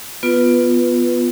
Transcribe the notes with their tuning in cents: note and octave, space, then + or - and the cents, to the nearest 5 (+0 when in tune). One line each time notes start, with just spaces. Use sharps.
B3 -5 F4 +0 B4 +0